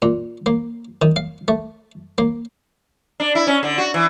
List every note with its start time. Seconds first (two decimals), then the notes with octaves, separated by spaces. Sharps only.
0.02 A#2
0.46 A#3
1.02 D#3
1.16 F5
1.48 A3
2.18 A#3
3.20 D4
3.35 E4
3.47 C#4
3.63 D3
3.78 F#4
3.94 E3